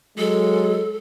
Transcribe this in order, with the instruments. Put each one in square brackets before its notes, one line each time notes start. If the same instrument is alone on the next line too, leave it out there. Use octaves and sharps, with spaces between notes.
[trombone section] F#3 G#3 [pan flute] A4